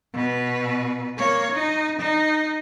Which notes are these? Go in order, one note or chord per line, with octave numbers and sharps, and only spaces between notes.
B2 B4
A#3 C#5
D#4
D#4